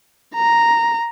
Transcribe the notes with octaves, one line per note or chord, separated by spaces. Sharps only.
A#5